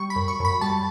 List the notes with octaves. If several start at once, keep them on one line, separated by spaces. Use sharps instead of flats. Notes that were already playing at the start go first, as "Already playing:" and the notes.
Already playing: G3 C#6
B5
F#2
C#6
F#2 B5
G3 A5